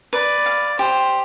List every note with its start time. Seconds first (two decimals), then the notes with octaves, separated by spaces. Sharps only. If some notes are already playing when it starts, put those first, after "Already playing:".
0.13 B4 D5
0.46 F5
0.79 G4 C5